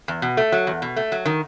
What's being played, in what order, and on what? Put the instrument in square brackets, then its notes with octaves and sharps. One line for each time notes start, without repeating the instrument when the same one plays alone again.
[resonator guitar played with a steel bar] E2
B2
A3
F#3
E2
B2
A3
F#3
D#3